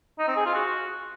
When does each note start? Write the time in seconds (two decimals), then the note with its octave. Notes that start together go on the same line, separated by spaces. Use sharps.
0.19 D#4
0.28 C4
0.36 G#4
0.45 F4
0.54 F#4